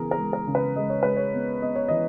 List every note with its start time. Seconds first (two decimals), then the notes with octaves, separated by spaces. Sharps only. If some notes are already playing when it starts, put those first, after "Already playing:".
Already playing: C#3 E3 B3 G#4 A#4
0.11 A#4
0.18 G#3
0.33 A#4
0.47 C#3
0.55 B4
0.76 G#3 D#5
0.90 C#5
1.03 G#3 B4
1.17 C#5
1.34 B3
1.62 B3 D#5
1.76 C#5
1.88 E3 D#5